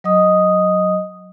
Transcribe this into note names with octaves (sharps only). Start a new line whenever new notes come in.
F#3 D#5 D#6